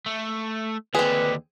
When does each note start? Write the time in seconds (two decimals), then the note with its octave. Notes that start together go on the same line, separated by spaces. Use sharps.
0.06 A3
0.95 D#2 D3 C4 G#4 B4